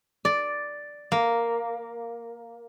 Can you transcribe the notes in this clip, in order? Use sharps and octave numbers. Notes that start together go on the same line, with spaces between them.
D5
A#3